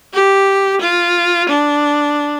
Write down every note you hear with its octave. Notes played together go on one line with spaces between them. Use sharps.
G4
F4
D4